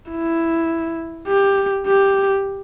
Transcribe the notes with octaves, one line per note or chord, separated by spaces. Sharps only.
E4
G4
G4